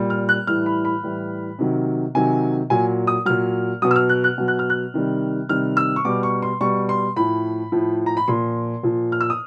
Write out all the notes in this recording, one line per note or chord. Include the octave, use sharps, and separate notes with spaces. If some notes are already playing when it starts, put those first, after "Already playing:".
Already playing: A#2 G3
F6
F#6
A2 E3 G3 F6
B5
B5
A2 E3 G3
C3 D#3 F#3
C3 D#3 F#3 G#5
A#2 F#3 G#5
D#6
A#2 F#3 F6
B2 F#3 D#6
E6
F6
F#6
F#6
B2 F#3
F#6
F6
F#6
C3 D#3 G3
C3 D#3 G3 F6
E6
C#6
B2 G3 D6
C#6
C6
B2 G3 C#6
C6
A2 F3 B5
A2 F3
A#5
B5
A#2 F3 C6
A#2 F3
F6
E6
D#6